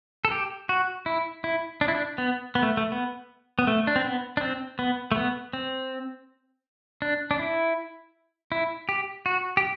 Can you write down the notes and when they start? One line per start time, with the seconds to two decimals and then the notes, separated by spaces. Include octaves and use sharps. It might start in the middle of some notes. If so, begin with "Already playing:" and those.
0.25 A4
0.31 G4
0.69 F#4
1.06 E4
1.44 E4
1.81 D4
1.88 E4
1.95 D4
2.18 B3
2.55 B3
2.63 A3
2.77 A3
2.92 B3
3.59 B3
3.67 A3
3.87 D4
3.96 C4
4.05 B3
4.37 D4
4.41 C4
4.79 B3
5.12 A3
5.16 B3
5.53 C4
7.02 D4
7.31 D4
7.39 E4
8.52 E4
8.89 G4
9.26 F#4
9.57 G4